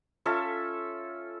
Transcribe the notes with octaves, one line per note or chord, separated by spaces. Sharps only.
C#4 F4 A4 E5